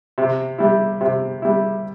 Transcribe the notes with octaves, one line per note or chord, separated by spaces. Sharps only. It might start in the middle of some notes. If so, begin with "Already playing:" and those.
C3
G3 E4
C3
G3 E4